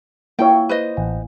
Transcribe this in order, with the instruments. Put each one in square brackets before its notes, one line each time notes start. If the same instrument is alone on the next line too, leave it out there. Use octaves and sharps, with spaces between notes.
[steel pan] A#3 E4 C#5 [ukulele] G5
[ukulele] B4 C5 D#5
[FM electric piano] A1